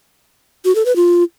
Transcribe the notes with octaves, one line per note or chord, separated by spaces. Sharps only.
F#4
A4
B4
F4